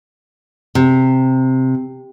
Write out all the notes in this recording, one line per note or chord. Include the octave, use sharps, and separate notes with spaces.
C3